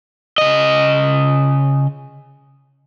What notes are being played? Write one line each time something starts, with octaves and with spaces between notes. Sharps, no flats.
C#3 D#5